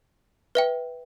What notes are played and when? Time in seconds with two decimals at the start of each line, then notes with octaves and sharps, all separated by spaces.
0.55 B4 E5 G5